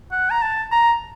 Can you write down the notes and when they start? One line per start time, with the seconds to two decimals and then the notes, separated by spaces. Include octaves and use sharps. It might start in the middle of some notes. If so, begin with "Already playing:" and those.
0.12 F#5
0.30 A#5
0.42 A5
0.72 A#5